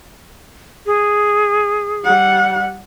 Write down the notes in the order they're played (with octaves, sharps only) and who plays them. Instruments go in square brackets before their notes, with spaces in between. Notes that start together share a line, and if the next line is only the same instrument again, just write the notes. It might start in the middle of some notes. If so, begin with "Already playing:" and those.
[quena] G#4
[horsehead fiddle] G3 F#5